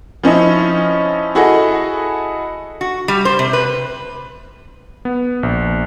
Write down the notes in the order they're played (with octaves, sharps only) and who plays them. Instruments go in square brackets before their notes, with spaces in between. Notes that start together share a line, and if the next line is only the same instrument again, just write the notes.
[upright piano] F3 C#4 D#4 E4
E4 F#4 G#4 A4 D#5
[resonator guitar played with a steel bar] F#4
G3
C5
C3
B4
[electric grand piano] B3
A#1